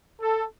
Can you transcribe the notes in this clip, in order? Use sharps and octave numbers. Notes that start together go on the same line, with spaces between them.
A4